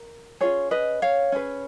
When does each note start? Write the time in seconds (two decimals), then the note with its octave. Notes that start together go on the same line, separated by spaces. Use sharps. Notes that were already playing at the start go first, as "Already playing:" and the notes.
Already playing: A#4
0.41 C#4 F4 G#4 C#5
0.71 B4 D#5
1.02 C#5 F5
1.32 C#4 G#4 B4